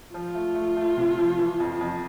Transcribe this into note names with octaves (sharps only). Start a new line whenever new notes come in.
F3 F4
A3
A3
A3
C3
F3
E3
F2
F2